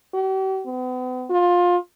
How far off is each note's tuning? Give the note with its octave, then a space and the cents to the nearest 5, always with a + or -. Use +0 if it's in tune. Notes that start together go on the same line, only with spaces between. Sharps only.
G4 -45
B3 +40
F4 +20